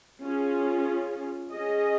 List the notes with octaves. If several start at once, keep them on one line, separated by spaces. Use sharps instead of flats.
C#4 F4 G#4
C#4 G#4 D#5